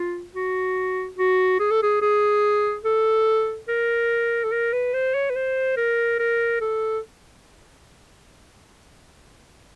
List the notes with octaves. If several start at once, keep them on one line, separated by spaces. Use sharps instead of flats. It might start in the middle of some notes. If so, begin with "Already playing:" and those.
Already playing: F4
F#4
F#4
G#4
A4
G#4
G#4
A4
A#4
A4
A#4
B4
C5
C#5
B4
C5
A#4
A#4
A4